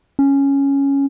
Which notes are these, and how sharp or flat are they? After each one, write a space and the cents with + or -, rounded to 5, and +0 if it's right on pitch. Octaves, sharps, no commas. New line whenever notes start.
C#4 +0